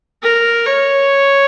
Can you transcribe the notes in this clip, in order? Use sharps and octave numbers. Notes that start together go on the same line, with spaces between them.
A#4
C#5